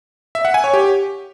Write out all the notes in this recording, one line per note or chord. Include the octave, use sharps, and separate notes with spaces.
E5
F#5
G#5
C#5
G4